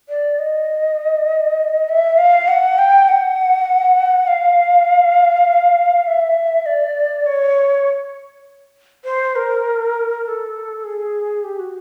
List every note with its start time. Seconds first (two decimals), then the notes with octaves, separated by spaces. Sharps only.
0.09 D5
0.39 D#5
1.89 E5
2.18 F5
2.48 F#5
2.78 G5
3.09 F#5
4.27 F5
6.07 E5
6.66 D5
7.26 C#5
9.05 C5
9.36 A#4
10.24 A#4
10.28 A4
10.84 G#4
11.44 G4
11.59 F#4